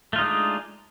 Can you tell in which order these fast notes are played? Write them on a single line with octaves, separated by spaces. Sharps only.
A3 F4 D#4 G#3 D4